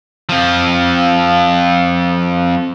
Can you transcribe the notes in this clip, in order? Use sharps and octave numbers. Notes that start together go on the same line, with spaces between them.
F2 F3